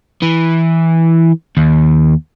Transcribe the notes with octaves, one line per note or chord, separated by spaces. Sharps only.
E3
D#2